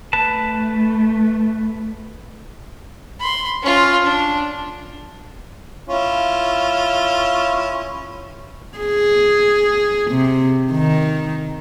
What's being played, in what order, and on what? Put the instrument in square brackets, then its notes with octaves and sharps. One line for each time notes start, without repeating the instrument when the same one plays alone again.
[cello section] A3 [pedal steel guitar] B4 A5
[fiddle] B5 C6
C#4 F4
D4
[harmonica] C#4 E4 F4
[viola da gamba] G#4
C3
D#3